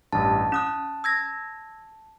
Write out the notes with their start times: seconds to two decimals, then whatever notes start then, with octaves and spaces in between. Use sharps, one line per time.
0.12 A1 G2 A5
0.52 C#4 D#6 F#6 E7
1.04 E6 G#6 A#6